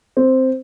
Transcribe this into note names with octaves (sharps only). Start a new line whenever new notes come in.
C4